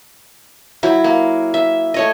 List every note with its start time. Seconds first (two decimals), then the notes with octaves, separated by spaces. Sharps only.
0.83 F#3 E4
1.04 A#3
1.54 E5
1.94 A3 C#5 D#5